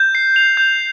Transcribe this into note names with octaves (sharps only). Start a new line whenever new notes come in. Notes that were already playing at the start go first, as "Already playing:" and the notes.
Already playing: G6
C7
F7
G6